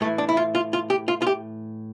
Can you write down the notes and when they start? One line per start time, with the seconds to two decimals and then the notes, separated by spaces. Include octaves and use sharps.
0.01 A2 A3
0.04 E3
0.18 D4
0.29 E4
0.37 F4
0.55 F4
0.73 F4
0.90 G4
1.08 F4
1.22 F4
1.27 G4